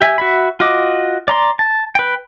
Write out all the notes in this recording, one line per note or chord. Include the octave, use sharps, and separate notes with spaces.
G4 E5 G#5
F#4 E5 B5
F4 F#4 D#5 D6
D5 A#5 C6
A5
B4 G5